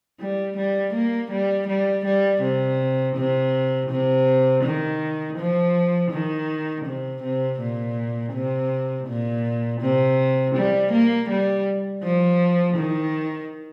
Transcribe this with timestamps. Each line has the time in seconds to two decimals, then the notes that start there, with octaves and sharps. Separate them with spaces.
0.20 G3
0.58 G3
0.94 A#3
1.31 G3
1.68 G3
2.05 G3
2.42 C3
3.16 C3
3.90 C3
4.64 D#3
5.38 F3
6.11 D#3
6.85 C3
7.23 C3
7.60 A#2
8.33 C3
9.08 A#2
9.81 C3
10.56 G3
10.92 A#3
11.30 G3
12.03 F3
12.77 D#3